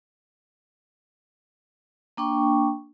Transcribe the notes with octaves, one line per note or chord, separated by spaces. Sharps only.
A#3 D4 G5 C#6